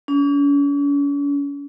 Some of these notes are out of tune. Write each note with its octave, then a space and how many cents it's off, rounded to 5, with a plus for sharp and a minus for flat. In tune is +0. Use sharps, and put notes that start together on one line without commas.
C#4 +45